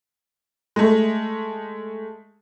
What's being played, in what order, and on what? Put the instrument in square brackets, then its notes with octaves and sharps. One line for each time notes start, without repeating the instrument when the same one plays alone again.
[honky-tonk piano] G#3 A3